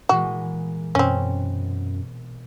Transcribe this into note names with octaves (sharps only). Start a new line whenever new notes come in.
A#2 E3 G#3 F#4
F#2 B2 C4 C#4